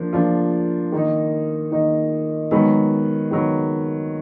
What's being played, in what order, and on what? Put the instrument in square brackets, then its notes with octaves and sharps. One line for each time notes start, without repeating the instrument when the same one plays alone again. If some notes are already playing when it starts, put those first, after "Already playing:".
Already playing: [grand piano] F3 A#3 D4
F3 A#3 D4 F4
D#3 A#3 D#4
D#3 A#3 D#4
[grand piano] D#3 F#3 B3 [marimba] G#3
[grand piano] D#3 F#3 B3